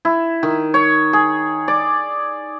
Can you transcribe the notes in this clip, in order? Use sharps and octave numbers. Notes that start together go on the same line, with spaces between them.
E4
D#3
C#5
G#4
D5